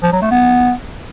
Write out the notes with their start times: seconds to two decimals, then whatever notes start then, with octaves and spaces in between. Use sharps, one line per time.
0.03 F3
0.12 F#3
0.22 A3
0.31 B3